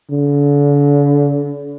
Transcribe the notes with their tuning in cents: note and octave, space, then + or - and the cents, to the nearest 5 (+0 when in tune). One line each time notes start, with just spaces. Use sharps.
D3 -40